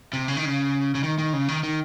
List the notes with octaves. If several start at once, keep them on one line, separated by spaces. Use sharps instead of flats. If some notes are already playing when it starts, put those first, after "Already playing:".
C3
C#3
D#3
C#3
C#3
D#3
D#3
C#3
D#3
D#3